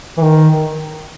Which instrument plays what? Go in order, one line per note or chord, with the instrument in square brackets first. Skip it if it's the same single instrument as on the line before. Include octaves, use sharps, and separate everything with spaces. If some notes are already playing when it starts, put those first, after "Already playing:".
[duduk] E3
D#3